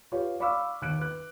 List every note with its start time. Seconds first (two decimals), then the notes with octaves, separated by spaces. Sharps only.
0.12 F4 G4 B4 C#5
0.40 D5 F5 B5 C#6 D6 E6
0.82 D#2 F#6 D7
0.99 B4 F#6